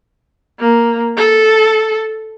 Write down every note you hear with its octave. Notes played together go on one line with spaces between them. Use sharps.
A#3
A4